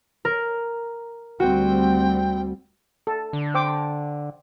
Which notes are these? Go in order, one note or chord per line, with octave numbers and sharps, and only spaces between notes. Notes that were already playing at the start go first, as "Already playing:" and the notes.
A#4
D2 G3 C4 F#4 G5
A4
D3
C5 G5 D6